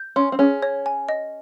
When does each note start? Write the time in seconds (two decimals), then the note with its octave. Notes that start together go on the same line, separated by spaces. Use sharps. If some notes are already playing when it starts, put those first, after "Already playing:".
Already playing: G6
0.16 C#4 C6
0.32 C4
0.39 C#4 G#4
0.62 C#5
0.86 G#5
1.09 D#5